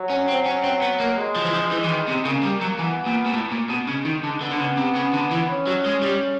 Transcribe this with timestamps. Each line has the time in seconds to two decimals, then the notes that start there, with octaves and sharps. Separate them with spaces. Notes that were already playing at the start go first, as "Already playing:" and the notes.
Already playing: F#3
0.09 C#4
0.28 C4
0.46 C#4
0.64 C4
0.82 B3
1.00 A#3
1.17 G#3
1.36 F3
1.45 E3
1.54 F3
1.71 E3 G#3
1.84 E3
1.89 D#3
2.08 C3
2.25 C#3 A#3
2.43 G3
2.62 F#3
2.79 E3 B3
3.06 A#2
3.26 A#2
3.33 A2
3.51 A#2
3.70 B2
3.87 C#3 G#3
4.05 D#3
4.23 D3
4.41 D3 B3
4.51 D3
4.59 C#3
4.77 C3
4.95 C#3
5.13 D3
5.31 E3
5.49 C#4
5.67 F#3
5.85 G#3
6.03 G3